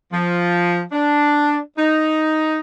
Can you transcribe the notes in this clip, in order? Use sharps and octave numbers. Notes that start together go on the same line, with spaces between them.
F3
D4
D#4